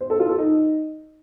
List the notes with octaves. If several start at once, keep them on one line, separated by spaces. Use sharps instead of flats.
C5
A4
F4
A4
D#4